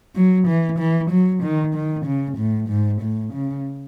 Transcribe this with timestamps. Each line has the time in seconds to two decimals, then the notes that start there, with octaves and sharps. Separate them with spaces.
0.16 F#3
0.47 E3
0.79 E3
1.10 F#3
1.43 D#3
1.75 D#3
2.06 C#3
2.38 A2
2.69 G#2
3.02 A2
3.33 C#3